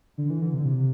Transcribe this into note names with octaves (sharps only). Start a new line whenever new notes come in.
D3
E3
D3
C3
D3
C3